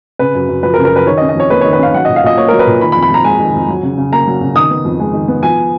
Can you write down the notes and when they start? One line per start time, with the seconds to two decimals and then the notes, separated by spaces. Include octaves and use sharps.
0.19 C#3 B4
0.34 F#2
0.49 F#2
0.63 F3 B4
0.74 A#4
0.78 C#3
0.85 A#4
0.92 F#2 B4
1.07 D#3 C#5
1.17 D#5
1.22 C#4
1.29 D#5
1.36 F2 C#5
1.50 A#3 B4
1.61 D#3 C#5
1.73 B4
1.79 C#4 F5
1.94 F#3 F#5
2.05 A#2 D#5
2.16 F5
2.23 A#2 D#5
2.37 A#3 C#5
2.48 F#3 A#4
2.59 B4
2.67 A#2
2.81 D#3 B5
2.92 B5
2.96 F2
3.02 B5
3.10 F2 A#5
3.24 G#3 G#5
3.39 D#3
3.54 F2
3.68 F#3
3.83 C#3
3.98 C#3
4.12 A#3 A#5
4.27 F#3
4.41 C#3
4.55 D#3 D#6
4.70 B3
4.85 F2
5.00 G#3
5.13 D#3
5.28 B3
5.43 F3 G#5